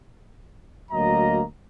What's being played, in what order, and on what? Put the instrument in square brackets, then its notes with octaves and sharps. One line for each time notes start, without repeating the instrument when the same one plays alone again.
[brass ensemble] D2 F#3 A#3 D#5 A#5